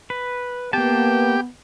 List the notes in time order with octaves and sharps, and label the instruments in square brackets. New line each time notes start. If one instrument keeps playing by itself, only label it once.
[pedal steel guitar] B4
[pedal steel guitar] A#3 A5 [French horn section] B3 [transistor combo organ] G4